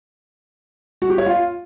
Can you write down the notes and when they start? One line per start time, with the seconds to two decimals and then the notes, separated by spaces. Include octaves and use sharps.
1.02 F#4
1.10 G4
1.18 C#5
1.26 F4